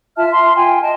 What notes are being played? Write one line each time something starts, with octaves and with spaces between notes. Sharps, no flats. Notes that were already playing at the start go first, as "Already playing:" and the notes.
F4 E5 A5 F6
C6
F4 G5 G#5
D#5 G5 A5